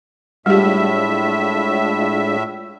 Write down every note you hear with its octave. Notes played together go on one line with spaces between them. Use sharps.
A2 G3 G#3 D4 F4 G4 E5